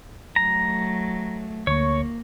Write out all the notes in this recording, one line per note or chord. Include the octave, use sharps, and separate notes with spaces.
F#3 A3 A#5
D2 A#3 C#5 C#6